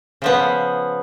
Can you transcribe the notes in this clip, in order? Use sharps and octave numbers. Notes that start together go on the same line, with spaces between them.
C#3 F3 B3